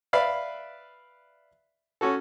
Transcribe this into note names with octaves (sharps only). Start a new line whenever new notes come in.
B4 D5 E5 F5 B5
C#4 F#4 A4